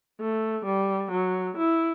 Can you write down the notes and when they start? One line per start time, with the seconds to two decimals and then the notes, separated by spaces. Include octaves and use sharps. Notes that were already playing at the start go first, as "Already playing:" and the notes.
0.20 A3
0.65 G3
1.12 F#3
1.58 E4